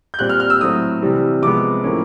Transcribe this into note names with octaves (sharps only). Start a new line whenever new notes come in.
G6
A#2 G3 C4 F#6
F6
F6
E6
A2 F#3 A3 C4 D#6
C3 E3 G3 C4
C3 F3 G#3 B3 D6
A2 F3 A#3 C#4